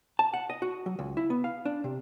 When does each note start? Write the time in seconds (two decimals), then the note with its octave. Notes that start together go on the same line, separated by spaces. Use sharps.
0.19 A5
0.34 F#5
0.50 D#5
0.62 F#4
0.86 F#3
0.99 C#2
1.17 E4
1.30 B3
1.44 F5
1.65 D4
1.84 C3